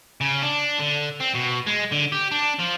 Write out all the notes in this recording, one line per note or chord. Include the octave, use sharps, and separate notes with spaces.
C#3
D4
D3
C4
B2
G#3
D3
G4
D4
F3